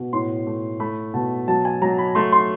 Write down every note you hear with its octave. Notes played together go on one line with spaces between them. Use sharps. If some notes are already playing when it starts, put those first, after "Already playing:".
Already playing: B2
A2 C6
A3
A3 B5
B2 A5
F#3 A5
G#5
F#3 A#5
B5
A3 C6
C6